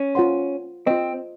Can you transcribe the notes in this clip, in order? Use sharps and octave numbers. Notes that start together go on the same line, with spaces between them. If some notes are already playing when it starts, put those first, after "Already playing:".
Already playing: C#4
F4 C5 F#5 C6
C4 F4 C5 D#5